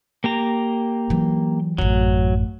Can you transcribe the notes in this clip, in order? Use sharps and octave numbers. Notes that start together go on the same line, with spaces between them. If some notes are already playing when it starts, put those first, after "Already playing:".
A#3 G4 A#5
E3 F#3
A1 F#2 F#3